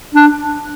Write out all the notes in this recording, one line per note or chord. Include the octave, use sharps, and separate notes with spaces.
D4